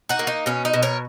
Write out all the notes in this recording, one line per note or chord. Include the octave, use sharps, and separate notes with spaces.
D#4 F#4
A#3
D#4
B2 C#4
D#4
B2
A#4 C#5